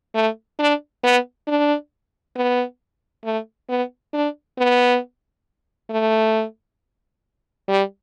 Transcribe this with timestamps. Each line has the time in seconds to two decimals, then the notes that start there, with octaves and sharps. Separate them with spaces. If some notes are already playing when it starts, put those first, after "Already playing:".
0.15 A3
0.60 D4
1.04 B3
1.47 D4
2.36 B3
3.25 A3
3.69 B3
4.14 D4
4.58 B3
5.90 A3
7.68 G3